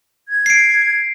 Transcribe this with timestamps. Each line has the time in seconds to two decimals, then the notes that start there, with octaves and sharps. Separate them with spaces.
0.28 G#6
0.46 C7 D7